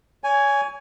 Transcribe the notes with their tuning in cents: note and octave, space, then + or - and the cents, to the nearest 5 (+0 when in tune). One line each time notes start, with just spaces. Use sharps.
C#5 +30 G#5 +0